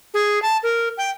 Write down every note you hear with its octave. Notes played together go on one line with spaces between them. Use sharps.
G#4
A5
A#4
G5